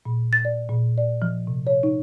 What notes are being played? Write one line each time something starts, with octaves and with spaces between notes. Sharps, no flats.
A#2
A6
D5
A#2
D5
F3
C3
C#5
D#4